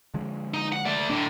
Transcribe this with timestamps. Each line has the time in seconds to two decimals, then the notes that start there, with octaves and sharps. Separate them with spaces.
0.14 D3 F3 G#3
0.54 D#4
0.72 F#5
0.86 A3 D5
1.10 A2 D3 D4